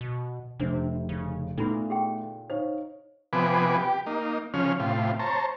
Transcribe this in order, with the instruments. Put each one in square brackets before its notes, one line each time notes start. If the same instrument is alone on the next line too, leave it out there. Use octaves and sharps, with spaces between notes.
[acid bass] B2
[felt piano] F1 [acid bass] C3 [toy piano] D4 C5
[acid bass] C#3
[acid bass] A#2 [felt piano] A3 B3 [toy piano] D#4 E4 B5
[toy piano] G4 G#4 G5
[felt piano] D#4 C#5 F5 [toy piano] C5
[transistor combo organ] C3 F3 B3 B4 G#5 D6
G4
A#3 D#4
C#3 F3 C#4 F6
A2 C3 F4
C5 C#5 A5 A#5